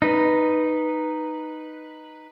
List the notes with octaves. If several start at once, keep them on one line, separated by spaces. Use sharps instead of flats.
D#4 B4